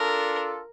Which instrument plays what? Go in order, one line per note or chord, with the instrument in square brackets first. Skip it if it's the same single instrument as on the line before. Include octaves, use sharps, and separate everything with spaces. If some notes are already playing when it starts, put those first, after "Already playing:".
Already playing: [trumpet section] D4 F4 A4 [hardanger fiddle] A#4